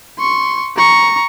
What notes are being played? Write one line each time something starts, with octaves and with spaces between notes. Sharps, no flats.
C6 C#6
A#5 C#6